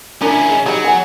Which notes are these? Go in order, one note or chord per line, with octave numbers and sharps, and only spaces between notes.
C#4 D4 E4 F4 A#4
G#4 D#5
F#3 G3 D#4
B3 F#5 G#5